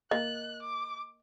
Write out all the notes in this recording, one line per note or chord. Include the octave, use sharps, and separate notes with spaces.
A#3 D#5 F#6
D6